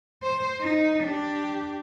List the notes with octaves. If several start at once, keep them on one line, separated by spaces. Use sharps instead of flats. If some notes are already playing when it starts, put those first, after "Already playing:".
C5
D#4
D4 G4